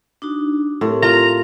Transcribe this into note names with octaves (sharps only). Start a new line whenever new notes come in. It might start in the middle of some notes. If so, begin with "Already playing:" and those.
D4 D#4 F#4
A2 C4 G4 A#4
F4 A#5